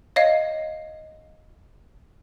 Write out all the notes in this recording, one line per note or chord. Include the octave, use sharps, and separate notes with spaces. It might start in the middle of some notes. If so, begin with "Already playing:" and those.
C#5 D#5 F5